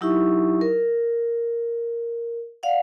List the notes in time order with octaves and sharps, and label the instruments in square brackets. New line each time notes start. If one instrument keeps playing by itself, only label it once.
[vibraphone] F#3 D#4 E4 G4 E5 C#6
A#4
D5 F5 F#5